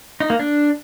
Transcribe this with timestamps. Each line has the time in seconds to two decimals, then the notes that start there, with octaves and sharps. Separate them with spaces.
0.20 D#4
0.30 A#3
0.39 D4